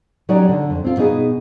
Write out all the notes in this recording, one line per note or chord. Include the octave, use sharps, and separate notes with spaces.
F#3 C#4 D#4 G4 D5
D3
F2
C4 F4
B2 B3 D#4 G#4